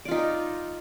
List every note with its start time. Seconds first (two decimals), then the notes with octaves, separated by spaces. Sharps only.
0.05 D5
0.08 F4
0.11 D#4